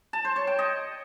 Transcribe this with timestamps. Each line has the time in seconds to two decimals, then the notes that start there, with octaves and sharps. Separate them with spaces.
0.13 A5
0.25 C5
0.36 C#5
0.47 G5
0.59 D#5